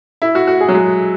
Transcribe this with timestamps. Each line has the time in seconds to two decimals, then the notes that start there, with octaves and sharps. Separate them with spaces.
0.22 E4
0.35 F#4
0.47 F#4
0.60 G#4
0.68 F#3
0.74 G#3